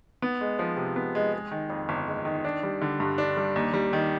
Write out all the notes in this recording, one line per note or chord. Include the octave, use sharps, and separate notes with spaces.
B3
G#3
F3
C3
B3
G#3
G#3
D#3
F2
G1
G#3
D#3
D4
G3
D3
G2
D4
G3
D#2
G3
D#3